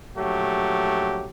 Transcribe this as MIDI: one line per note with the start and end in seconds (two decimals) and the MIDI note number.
0.16 1.29 34
0.16 1.29 54
0.16 1.29 57
0.16 1.29 67